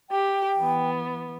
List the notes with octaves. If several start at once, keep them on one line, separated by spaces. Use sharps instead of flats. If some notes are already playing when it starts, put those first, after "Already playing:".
G4 G5
E3 B3